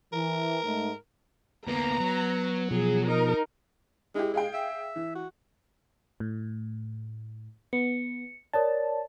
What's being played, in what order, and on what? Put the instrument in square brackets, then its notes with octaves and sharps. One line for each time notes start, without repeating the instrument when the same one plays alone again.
[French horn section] E3 [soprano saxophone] A#4
[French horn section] G#2 A3
[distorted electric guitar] D2 A#3 [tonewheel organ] B3 [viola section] A#5
[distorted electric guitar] F#3
[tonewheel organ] B2 F3 [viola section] G#4
[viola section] D#4 A#4
[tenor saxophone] G#3 [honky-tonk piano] E4 G4
[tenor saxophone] G#3 [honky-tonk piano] G#4 F5 G5
[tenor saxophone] E5
[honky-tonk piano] E3
[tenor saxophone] F#4
[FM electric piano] A2
[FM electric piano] B3 [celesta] C#7
[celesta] A#4 C#5 D5 [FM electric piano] A5